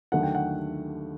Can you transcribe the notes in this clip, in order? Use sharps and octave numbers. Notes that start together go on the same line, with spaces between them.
D#2 D3 F#3 A3 F#5
G5
F#5